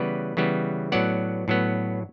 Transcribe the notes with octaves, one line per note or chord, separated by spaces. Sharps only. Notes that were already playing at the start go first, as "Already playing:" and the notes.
Already playing: C#3 E3 G3 B3 B4 D5
C#3 E3 G3 B3
A2 F#3 B3 D5 F#5
A2 F#3 B3